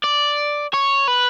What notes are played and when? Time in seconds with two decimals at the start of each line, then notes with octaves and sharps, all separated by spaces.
0.04 D5
0.74 C#5
1.08 B4